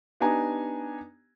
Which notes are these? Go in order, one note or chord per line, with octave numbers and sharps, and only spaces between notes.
B3 D4 D#4 G4 G#5 A#5